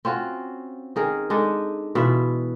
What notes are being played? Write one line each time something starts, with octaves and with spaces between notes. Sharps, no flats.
C4 C#4 F4 F#4
D#3 G#4 A#4
G#3 D4 D#4 A4
B2 E3 F4 E5